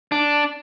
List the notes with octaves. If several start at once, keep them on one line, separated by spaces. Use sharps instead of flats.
D4